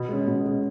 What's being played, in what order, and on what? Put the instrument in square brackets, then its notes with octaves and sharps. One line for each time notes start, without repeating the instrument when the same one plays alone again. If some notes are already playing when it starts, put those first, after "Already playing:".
Already playing: [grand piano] B2
G#3 C#4
B2
G#3 C#4